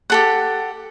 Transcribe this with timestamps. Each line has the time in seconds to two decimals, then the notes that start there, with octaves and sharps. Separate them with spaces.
0.10 G4 A4 F#5